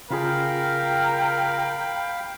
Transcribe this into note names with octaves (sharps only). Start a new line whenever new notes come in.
C#3 F4 G#4 A#4 F5 G5 B5